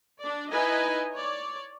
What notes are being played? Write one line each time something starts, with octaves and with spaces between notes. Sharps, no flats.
D4 D5
D#4 E4 B4 D#5 G#5
C#5 D5